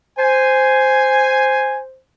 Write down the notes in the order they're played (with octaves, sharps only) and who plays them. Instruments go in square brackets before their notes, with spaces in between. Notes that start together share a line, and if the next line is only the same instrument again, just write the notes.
[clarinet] C5 [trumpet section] G#5